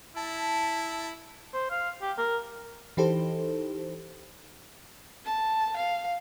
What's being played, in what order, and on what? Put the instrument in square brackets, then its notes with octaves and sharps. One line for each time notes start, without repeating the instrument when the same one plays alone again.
[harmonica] E4 [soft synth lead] A5
[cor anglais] C5
F5
G4
A#4
[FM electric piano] E3 D#4 G4 A4 C5
[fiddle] A5
F5